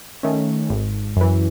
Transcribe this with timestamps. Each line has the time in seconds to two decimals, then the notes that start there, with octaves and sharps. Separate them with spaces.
0.23 D#3 A3 C#4
0.70 G#1
1.16 F#2 E3